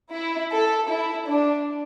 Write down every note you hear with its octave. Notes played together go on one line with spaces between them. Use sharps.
E4
A4
E4
D4